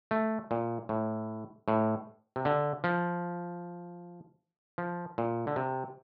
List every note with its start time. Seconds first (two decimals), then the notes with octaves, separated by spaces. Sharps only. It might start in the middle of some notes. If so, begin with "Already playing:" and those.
0.11 A3
0.51 A#2
0.89 A2
1.68 A2
2.36 C3
2.45 D3
2.84 F3
4.78 F3
5.18 A#2
5.47 D3
5.56 C3